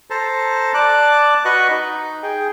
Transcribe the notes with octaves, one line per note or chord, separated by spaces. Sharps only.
A4 C5 A5 A#5
D5 A5 D6 F#6
F#4 B4 D#5 C#6 F#6
D#4
G#4 G5